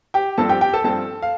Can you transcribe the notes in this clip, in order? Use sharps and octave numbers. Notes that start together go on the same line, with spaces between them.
G4 G5
G2 F3 C4 A4 A5
G4 G5
G4 G5
A4 A5
G2 F3 C4 A4 A5
F5